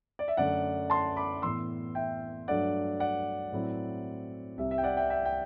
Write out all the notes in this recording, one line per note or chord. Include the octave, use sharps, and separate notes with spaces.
D5
E5
F#2 D3 A3 D5 F#5
A5 C6
B5 D6
A2 E3 B3 C6 E6
E5 G5
G2 F#3 A3 D4 D5 F#5
D5 F#5
A2 F#3 C4 E4
C2 C3 G3 E5
E5
G5
D5 F#5
E5 G5
E5 G5
G5